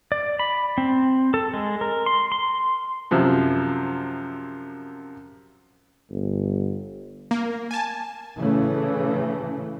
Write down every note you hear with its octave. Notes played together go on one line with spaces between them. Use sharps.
D5
B5
C4
A4
G#3
A#4
C6
C6
F#2 C3 F3
G1
A#3
G#5 A5
A2 C#3 E3 A3